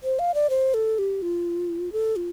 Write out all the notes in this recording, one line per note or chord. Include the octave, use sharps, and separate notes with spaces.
C5
F5
D5
C5
A4
G4
F4
A4
F4